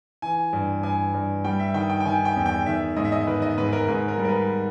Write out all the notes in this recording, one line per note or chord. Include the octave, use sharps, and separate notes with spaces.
E3 G#5
G2
G2 G#5
G2
G3 G5
E5
D#3 G5
G5
G5
D#3 G#5
G5
E2
G5
D#3 E5
G#2 D#5
E5
D#5
D#3 B4
D#5
G#2 B4
B4
A#4
G#2 B4
A#4
G3
A#4
B4